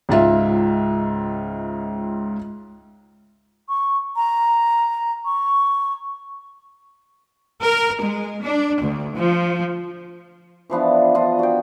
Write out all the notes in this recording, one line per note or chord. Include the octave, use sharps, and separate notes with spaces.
C#2 G#2 F4 E5
C#6
A#5
C#6
A#4
G#3
D4
D2
F3
E3 F3 B3 D4
D4 F4 D#5
F#4 G5